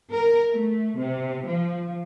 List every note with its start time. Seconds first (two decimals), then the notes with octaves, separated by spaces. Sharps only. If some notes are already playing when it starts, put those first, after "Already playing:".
0.13 A#4
0.52 A3
0.97 C3
1.46 F3